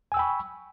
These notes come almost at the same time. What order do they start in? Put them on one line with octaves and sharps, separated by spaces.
G#5 E6 G5 B5 C#6